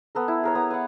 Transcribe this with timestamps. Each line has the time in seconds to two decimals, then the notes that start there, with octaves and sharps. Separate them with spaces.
0.15 B3 A4 A#4
0.28 E4
0.43 G#4 A#4 C#5
0.55 B3 A#5
0.71 B4 F#5